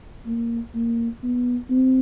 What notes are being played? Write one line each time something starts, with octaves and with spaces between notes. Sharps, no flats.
A#3
A#3
B3
C4